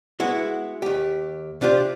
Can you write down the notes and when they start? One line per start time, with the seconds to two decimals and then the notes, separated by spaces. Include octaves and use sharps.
0.20 G#3 B3 E4 F#4
0.82 D#2 G4
1.61 C3 D4 F4 G4 C5